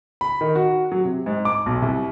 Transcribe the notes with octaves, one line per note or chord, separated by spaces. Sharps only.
B5
D#3
F#4
F#3
C3
G#2
D6
B1
C2